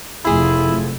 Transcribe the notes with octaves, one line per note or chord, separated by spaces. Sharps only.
F1 F2 A3 E4 F4 G#4